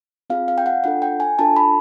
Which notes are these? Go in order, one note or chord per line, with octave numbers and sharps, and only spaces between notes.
C4 F4 G#4 F5
F5
G5
F#5
D4 F4 A4 F#5
G5
G#5
D4 F4 A4 A5
B5